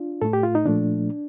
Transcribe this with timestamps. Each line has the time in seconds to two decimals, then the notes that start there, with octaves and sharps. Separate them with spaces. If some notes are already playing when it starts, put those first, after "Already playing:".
Already playing: D4 F4
0.22 A2 A3 A4
0.33 G4
0.43 F4
0.55 D#4
0.65 A#2 F3 A3 D4